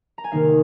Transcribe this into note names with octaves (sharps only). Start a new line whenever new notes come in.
A#5
G#5
C3 D#3 A#3 D#4 F5